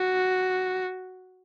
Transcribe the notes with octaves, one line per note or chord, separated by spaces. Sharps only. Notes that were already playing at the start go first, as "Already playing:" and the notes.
Already playing: F#4